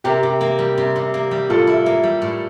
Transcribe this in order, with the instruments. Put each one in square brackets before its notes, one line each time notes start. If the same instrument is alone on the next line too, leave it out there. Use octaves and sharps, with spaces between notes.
[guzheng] C3 [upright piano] G4 A#4
[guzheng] C3
A#3
G3
C3
C3
A#3
G3
[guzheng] A2 [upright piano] F4 A4
[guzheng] E4
A#3
G3
A2